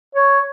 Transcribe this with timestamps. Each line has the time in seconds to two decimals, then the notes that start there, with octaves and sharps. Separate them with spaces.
0.15 C#5